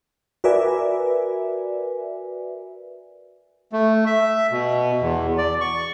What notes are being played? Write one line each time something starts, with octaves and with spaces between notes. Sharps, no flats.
F#4 A#4 B4 D5 E5 G#5
A3
E5
B2
E2
D5
C#6